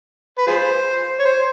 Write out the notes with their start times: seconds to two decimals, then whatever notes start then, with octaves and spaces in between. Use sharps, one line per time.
0.38 B4
0.47 F4 G#4 C5
1.20 C#5
1.26 C5